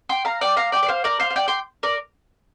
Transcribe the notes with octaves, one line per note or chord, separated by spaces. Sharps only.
G5 C6
F5 A#5
D5 G5
F5 A#5
D5 G5
D5
C5 F5
A#4 D5
C5 F5
F5
D5 G5
G5 C6
A#4 D5